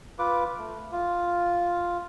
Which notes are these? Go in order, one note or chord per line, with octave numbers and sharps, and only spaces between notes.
F4 B4 D6
A3
F4